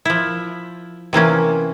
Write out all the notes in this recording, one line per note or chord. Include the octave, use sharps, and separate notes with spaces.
F3 E4
C3 E3 A#3 C#4